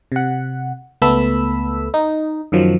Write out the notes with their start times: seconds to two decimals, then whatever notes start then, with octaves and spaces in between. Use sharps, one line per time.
0.12 C3 F#5
1.02 C#2 A3 B3 A4 B5 E6
1.94 D#4
2.52 F#2 D#3 F3 F#3